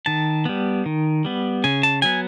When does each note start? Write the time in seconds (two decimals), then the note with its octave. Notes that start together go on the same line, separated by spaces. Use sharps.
0.06 D#3 A5
0.45 G3 B3
0.86 D#3
1.25 G3 B3
1.64 C#3 G#5
1.83 A5
2.02 F#3 B3 G#5